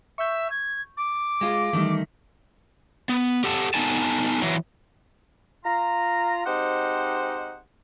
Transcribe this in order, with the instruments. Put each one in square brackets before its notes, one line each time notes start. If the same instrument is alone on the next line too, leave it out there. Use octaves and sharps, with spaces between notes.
[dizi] E5 [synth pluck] C#6 G6
[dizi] G#6
D6
[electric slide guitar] G#3 F4
[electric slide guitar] D#3 A3 [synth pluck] E3 G3
[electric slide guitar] B3
G4 A4 F#5 A5
B3 D#4 A4 G#5 A5
E3 F#3
[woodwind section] F4 A#5
G#3 C4 D#4 G4 C5 F#5